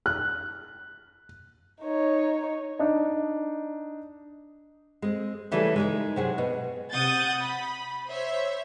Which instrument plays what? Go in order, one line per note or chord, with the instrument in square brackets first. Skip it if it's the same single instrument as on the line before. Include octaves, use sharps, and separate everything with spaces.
[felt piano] F#6
[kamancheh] D#4 C#5
[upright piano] D4 D#4
[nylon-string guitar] G#3 C4
C#3 E3 G3 A3 G#4
G#3 D#4 A#4
C3 F#3 G#4
B2
[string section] C3 F#5 D#6 G6 A6
B5
C5 C#5 E5